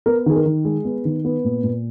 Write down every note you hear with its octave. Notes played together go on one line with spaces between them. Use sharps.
B3 A#4
D#3 G#4
A#4
D#3
G#3 G#4
B3
D#3
B3
A#2
A#2